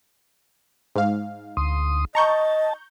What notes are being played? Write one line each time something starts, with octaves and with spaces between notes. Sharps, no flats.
G#2 F5
D2 C6 D#6
D#5 A5 A#5 C#6 G6